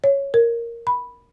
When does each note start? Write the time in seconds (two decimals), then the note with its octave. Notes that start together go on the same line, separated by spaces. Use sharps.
0.04 C#5
0.34 A#4
0.87 B5